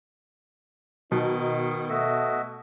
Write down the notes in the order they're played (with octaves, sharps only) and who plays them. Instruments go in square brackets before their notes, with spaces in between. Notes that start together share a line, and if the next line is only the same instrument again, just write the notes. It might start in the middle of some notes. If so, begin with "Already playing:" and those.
[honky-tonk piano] B2 [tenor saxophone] D#3 [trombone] D#4
[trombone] A3 [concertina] F#4 D#5 E5